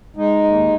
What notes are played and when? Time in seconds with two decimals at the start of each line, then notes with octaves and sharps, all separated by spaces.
0.16 G#3 D#4
0.44 D#2